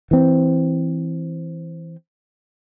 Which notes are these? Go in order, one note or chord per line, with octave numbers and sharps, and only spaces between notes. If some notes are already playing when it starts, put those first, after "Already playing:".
E3 C4